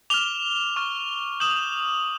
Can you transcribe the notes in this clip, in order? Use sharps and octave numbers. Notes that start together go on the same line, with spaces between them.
D6 F6 F7 G7
C#6 F6
D#6 G6 E7 F#7